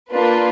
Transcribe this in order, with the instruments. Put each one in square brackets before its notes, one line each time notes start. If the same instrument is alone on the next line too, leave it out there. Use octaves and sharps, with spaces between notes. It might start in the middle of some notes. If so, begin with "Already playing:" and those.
[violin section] A#3 D4 F4 B4